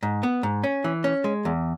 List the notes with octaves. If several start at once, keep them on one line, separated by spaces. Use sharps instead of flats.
G#2
B3
G#2
C#4
E3
C#4
G#3
E2